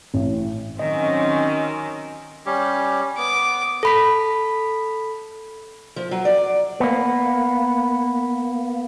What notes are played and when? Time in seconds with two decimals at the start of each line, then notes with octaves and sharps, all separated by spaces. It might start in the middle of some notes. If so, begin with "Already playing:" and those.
0.14 A1
0.79 D#3 F#3 C4 C#4 D#5
2.46 G3 C#4 G4
3.18 B3 D6
3.83 A4 B5 B6
5.96 F3
6.11 F#3
6.25 D5
6.80 A#3 B3